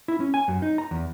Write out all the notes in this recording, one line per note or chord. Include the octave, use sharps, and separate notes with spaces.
E4
C#4
G#5
F#2
D#4
A#5
E2